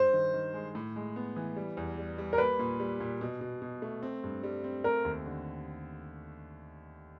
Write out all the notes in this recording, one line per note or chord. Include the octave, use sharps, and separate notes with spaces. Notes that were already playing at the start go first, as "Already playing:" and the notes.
Already playing: G2 C5
D#3
D#3
G#3
A2
G#3
B3
E3
G3
E2
G3
G3
A#4
A#3 B4
A#2
G3
A#2
B2
B2
B2
A3
C4
G2
G3
C4
A3 A#4
D#2
D3